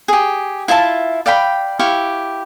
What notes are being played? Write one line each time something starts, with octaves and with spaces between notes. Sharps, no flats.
G4 G#4
E4 F4 E5 A5
D5 F5 G5 B5
E4 G4 F5 C#6